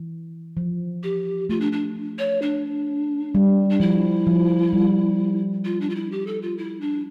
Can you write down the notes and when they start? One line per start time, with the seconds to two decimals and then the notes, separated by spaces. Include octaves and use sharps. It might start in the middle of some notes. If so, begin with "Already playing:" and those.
Already playing: E3
0.57 F3
1.03 G4
1.49 A3 F4
1.60 D4
1.72 D4
2.18 C#5
2.42 D4
3.35 G3
3.70 D4
3.80 F3 E4
4.27 F3
4.73 G3
5.65 F4
5.81 D4
5.90 F4
5.95 E4
6.12 G4
6.27 A4
6.42 F4
6.58 E4
6.81 D4